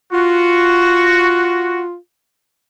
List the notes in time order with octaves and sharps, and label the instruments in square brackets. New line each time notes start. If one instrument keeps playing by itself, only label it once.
[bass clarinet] F4 [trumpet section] F#4